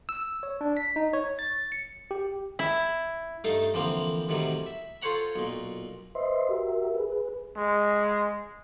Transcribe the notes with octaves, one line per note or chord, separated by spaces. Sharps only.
E6
C#5
D4
B6
D#4
C#5
A6
C#7
G4
E4
G2 A3 D#4 A4 F5 A5
D3 E3 F3 A#3 C4
A2 C3 D#3 F#3 G3
E5
F4 A4 C5 C#5 F#5 A#5
B1 A#2
B4 C5 D#5 E5 C6
F#4 G4 A#4 E5
G#4 B4
G#3